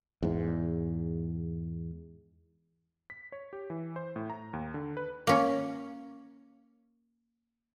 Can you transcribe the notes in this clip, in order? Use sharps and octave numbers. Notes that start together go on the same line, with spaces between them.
E2 G#2
B6
C#5
G4
E3
C5
A2
A#5
D#2
D3
B4
A#3 C#4